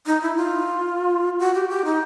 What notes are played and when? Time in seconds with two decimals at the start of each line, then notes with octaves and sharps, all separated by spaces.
0.06 D#4
0.22 E4
0.36 F4
1.39 F#4
1.55 G4
1.69 G4
1.85 D#4